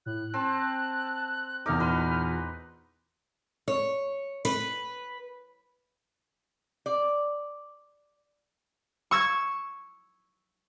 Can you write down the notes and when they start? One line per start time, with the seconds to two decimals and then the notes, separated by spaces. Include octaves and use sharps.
0.06 A2 F#6
0.34 C4 A5
1.66 E2 D#4 A#4 D6 F6
1.80 A#2 B4 C6
3.68 C#5
4.45 B4
6.86 D5
9.11 C#6 E6 G#6